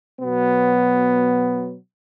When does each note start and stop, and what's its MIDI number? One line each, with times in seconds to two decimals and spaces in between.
0.21 1.77 47
0.21 1.77 54
0.21 1.77 59